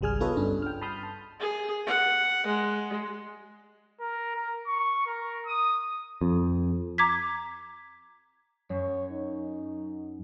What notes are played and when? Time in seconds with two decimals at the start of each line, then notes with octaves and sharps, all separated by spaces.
0.01 G#1 C#2 G3 G#4 G#5 F6
0.20 B3 F4 A4 B4 C#5 D#5
0.37 G2 C#4 D4
0.62 G5 F6
0.81 A5 B5 C6 D#6 F6 G6
1.03 A5
1.40 G#4
1.87 F#5
2.47 G#3
4.00 A#4
4.36 A#4
4.67 C#6
5.07 A#4
5.46 D#6
6.21 F2
6.98 A#5 D6 G#6 B6
8.70 F#2 C#5
9.12 D#4